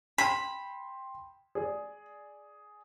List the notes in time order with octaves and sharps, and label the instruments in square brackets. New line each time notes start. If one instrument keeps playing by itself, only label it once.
[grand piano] G5 C6 E7 [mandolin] B5
[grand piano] G#4 D5